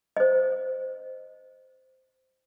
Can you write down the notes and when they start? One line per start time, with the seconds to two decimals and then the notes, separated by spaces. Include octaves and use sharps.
0.17 C5 D#5